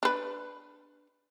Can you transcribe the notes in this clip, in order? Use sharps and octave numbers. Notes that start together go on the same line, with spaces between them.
D4 B4